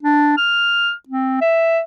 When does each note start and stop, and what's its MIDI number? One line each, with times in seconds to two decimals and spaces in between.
0.03 0.36 62
0.38 0.92 89
1.09 1.41 60
1.42 1.81 76